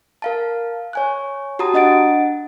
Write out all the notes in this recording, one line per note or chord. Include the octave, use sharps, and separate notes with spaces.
A#4 F5 A5
C#5 G#5 F#6
F#4 G4 A5 A#5 D#6
D4 D#5 F#5 A6 D7